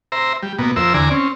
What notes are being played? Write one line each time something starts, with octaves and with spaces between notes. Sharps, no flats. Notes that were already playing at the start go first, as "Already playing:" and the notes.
C5 E5 A#5
G3
B2 A#3 B3
F2 A#4 C5 E5 E6
E2 D3 D5 G#5 A#5
C4 C#4